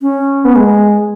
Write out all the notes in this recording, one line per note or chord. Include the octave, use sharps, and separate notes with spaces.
C#4
B3
G#3